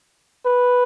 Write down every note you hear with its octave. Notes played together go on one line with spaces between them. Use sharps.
B4